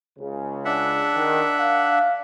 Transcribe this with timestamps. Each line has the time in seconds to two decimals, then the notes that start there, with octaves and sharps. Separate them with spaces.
0.19 C#2 C#3
0.65 D4 E5 F#5
1.15 D#3
1.58 F5